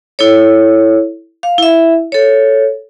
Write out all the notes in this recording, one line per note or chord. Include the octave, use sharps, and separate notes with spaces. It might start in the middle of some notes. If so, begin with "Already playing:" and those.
E4 A4 C#5
F5
E4 E5
A4 C#5